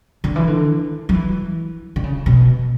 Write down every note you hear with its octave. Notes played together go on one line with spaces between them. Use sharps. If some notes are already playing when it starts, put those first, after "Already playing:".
D3
E3
D3
F#3
E3
D3
C#3
B2